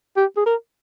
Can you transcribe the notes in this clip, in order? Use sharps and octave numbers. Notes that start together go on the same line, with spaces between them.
G4
G#4
A#4